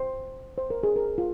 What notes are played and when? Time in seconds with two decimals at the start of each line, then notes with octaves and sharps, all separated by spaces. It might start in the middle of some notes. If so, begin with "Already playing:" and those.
Already playing: C5
0.58 C5
0.70 A#4
0.83 G#4
0.96 A#4
1.18 F4